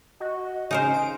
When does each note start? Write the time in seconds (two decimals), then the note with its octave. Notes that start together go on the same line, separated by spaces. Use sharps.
0.20 F#4 D#5
0.71 C#3 D#4 A#4 C5 G#5
0.94 D7